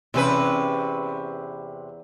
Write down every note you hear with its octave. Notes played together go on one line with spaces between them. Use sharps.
E2 C3 C4 C#4 B4